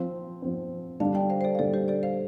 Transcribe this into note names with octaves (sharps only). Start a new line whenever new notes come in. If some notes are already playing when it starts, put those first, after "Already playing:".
Already playing: F3 C4 C5 F5
F3 C4
D3 G3 D4 F5 A5
D5 G5
C5 F5
C5
A4 D5
F5
D3 G3 D4 A4 D5
G4 C5
A4 D5
C5 F5